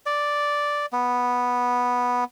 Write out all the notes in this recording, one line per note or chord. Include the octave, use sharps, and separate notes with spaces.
D5
B3